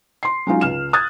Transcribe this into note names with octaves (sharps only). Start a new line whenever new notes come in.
C6 C7
F#3 G#3 C#4 D#4 F4
C#2 F6 E7
D#6 F#6 G#6 A6